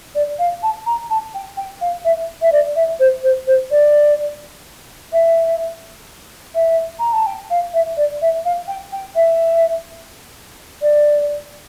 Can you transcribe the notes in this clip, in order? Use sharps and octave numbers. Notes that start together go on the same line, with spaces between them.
D5
F5
A5
A#5
A5
G5
G5
F5
E5
E5
D5
E5
C5
C5
C5
D5
E5
E5
A#5
A5
G5
F5
E5
D5
E5
F5
G5
G5
E5
D5